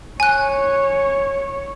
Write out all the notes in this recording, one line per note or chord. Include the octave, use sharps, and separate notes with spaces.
C#5 G#5 F#6